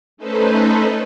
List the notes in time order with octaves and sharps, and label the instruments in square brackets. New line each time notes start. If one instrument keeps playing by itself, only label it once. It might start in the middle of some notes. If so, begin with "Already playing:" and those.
[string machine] A3 C#4 D#4 A4 B4 C5